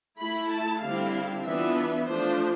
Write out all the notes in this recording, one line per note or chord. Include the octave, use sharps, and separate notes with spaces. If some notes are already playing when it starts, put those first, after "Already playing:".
A3 E4 B5
A5
D3 G3 C4 E4 F5
E3 B3 D4 F4 E5
F3 A3 D4 F4 C5